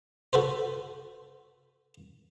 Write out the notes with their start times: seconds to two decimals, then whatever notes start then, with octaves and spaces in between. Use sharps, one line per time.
0.33 F#4 A4 B4 C5